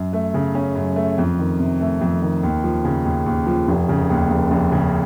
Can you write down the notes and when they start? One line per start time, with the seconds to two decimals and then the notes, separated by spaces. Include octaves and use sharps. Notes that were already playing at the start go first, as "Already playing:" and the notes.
Already playing: F#2
0.13 A3
0.34 C#3
0.55 C#4
0.75 F#2
0.96 A3
1.18 F2
1.39 D#3
1.59 C3
1.81 A3
2.01 F2
2.22 D#3
2.43 D#2
2.64 F3
2.84 C#3
3.05 D#2
3.26 D#2
3.47 F3
3.68 F1
3.89 C#3
4.10 D#2
4.31 F1
4.51 F1
4.72 C#3